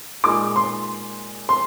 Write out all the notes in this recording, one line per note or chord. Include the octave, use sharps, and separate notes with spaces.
A#2 G#3 D#4 D6
C6
C6